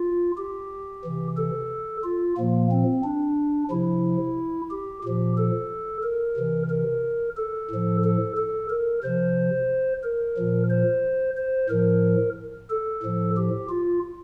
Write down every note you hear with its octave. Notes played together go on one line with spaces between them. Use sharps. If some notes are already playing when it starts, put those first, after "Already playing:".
Already playing: F4
G4
C3 E3
A4
F4
A#2 F3 A#3
C4
D4
C3 F3 E4
G4
A#2 F3 G4
A4
A#4
C3 E3
A#4
A4
A2 F3
A4
A4
A#4
C3 F3 C5
A#4
A#2 F3
C5
C5
A2 F3 A#4
A4
A2 F3
G4
F4